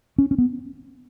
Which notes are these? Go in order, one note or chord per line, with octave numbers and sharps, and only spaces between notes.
C#4
C#4
B3